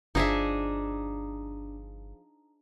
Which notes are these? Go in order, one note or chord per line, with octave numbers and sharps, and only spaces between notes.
G1 F3 D4 D#4 G#4 E5